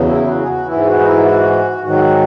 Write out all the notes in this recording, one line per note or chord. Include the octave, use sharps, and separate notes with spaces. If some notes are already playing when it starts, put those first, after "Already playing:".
Already playing: E2 C#3 F#3
E4
F#4
G#4
F#4
E3 E4
G#2
F#4
D#4
E4
F#4
G#2 D#3 F#3 F#4